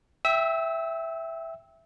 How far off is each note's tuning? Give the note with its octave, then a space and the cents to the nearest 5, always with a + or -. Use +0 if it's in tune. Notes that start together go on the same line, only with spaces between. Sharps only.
E5 +0 G5 +0 E6 -30